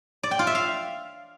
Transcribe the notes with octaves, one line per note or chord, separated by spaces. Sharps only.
D5
G5
F4
E5
F5